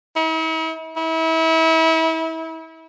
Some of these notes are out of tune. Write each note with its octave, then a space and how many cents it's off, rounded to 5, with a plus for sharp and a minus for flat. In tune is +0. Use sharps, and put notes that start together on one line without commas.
E4 -45
E4 -30